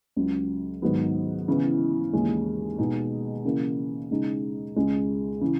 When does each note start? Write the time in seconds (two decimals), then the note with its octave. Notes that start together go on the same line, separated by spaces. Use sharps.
0.16 C#2 C#3 F#3
0.82 G#2 D#3 F#3 B3
1.48 C#3 E3 B3 E4
2.13 D#2 C#3 E3 G#3 C#4
2.78 B2 G#3 D#4
3.45 C#3 E3 A#3
4.11 C#3 G#3 D#4
4.76 C#2 C#3 G#3
5.41 C#3 E3